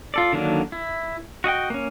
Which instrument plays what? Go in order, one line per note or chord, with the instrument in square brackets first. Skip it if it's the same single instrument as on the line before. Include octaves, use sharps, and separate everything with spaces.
[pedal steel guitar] F4 A4 D5
D3 D#3 F#3 A#3 D4
E4
F#4 D#5 F#5 G5
A#3 C#4